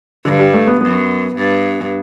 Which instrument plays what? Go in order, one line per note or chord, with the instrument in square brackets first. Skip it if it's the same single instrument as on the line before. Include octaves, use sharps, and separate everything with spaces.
[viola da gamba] G2 [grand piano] D3
[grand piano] G3
A3
B3
[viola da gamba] F#2 [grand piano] B3
[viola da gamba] G2